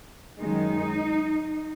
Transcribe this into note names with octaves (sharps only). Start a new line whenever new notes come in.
F#2 D#3 G#3 D#4